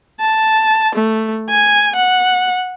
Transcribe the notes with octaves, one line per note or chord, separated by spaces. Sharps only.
A5
A3
G#5
F#5